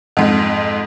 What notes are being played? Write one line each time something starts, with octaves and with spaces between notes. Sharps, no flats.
F2 G#2